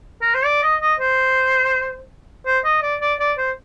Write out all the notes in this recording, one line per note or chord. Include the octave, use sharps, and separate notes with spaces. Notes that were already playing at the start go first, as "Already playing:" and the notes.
A#4
C5
D5
D#5
D#5
C5
C5
D#5
D5
D5
D5
C5